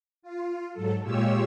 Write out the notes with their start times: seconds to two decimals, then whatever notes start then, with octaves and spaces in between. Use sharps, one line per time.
0.22 F4
0.72 G#2 F#3 A4
1.03 A#2 G#3 F4 G4 C#5 E6